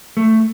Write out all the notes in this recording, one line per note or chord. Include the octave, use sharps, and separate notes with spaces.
A3